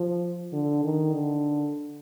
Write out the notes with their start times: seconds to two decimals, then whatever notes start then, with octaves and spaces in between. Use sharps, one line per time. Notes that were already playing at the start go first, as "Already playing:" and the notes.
Already playing: F3
0.52 D3
0.84 D#3
1.14 D3